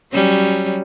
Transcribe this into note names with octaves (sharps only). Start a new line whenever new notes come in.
F#3 G3 C#4